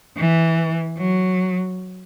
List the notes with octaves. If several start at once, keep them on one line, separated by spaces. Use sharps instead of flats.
E3
F#3